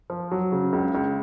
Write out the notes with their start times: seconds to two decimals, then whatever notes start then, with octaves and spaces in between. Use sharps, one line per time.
0.10 F3
0.31 F#3
0.52 C#3
0.73 C#2
0.95 C#2